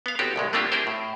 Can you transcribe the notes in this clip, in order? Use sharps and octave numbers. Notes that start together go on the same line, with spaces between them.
B3 F5
A1 B3 C4 F#4 G4
C2 A2 G#3
A3 A#3 C4 D4 F4 G4
C4 E4 G4 G#4 A#4 C5
A2